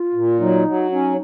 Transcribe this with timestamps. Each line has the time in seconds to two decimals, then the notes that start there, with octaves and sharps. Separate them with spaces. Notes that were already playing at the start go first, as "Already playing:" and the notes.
Already playing: F4
0.14 A#2
0.40 F#3 D#4
0.67 F#3
0.92 C#4 D#4